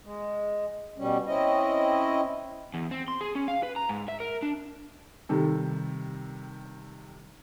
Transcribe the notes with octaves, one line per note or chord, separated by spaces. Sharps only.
G#3
B2 G3 C#4
C4 C#4 E4 D#5
E2
C4
C6
G#4
C#4
F5
B4
A#5
G#2
E5
A#4
D4
C3 D#3 G3 A4